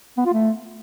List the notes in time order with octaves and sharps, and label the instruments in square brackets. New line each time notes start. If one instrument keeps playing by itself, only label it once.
[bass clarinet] B3
F4
A3